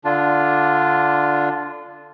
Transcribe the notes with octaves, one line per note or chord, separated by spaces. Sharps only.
D3 D4 F4